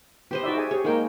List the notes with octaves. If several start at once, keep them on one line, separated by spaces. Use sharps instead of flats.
B3 G4 C5 D#5
D#4 F#4 D5 E5
G#4 E5 G#5
G4 G#4 C#5
G#3 A#3 D#4 A#4 G5